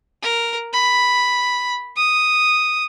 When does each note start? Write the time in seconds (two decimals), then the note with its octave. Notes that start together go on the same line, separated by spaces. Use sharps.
0.23 A#4
0.73 B5
1.96 D#6